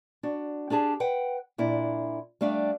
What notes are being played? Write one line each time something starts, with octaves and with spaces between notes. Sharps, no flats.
D4 F#4
D4 G4 G#4 A5
B4 F#5 G5
A#2 D4 E4
G3 A3 D4 F5 G5